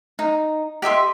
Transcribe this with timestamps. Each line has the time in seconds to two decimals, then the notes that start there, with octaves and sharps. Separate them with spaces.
0.19 D#4
0.82 G4 D#5 E5 C6